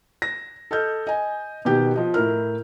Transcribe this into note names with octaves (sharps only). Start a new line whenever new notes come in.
A#6
A4 D#5 F6 G6
D#5 G#5
B2 D#3 G4 G6
F3 D#5
A2 E4 A#4 F6